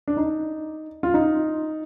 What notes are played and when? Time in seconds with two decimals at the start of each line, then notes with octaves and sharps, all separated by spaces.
0.08 D4
0.17 D#4
1.03 F4
1.14 D#4